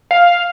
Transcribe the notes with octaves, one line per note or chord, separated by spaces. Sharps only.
F5